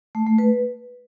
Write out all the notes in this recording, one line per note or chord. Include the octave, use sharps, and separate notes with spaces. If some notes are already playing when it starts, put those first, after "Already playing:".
A3
A3
B4